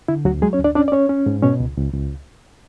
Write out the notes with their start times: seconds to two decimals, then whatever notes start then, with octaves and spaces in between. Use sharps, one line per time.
0.08 D3 E4
0.25 D2 F#3 F#4
0.42 F#3 G#3 G#4
0.53 C#4 C#5
0.60 D2 D4 D5
0.75 C#4 D4 D5
0.88 D5
0.92 C#4 C#5
1.09 C#4
1.26 G#2
1.43 B2 C#4 C#5
1.60 C#2
1.77 C#2
1.93 C#2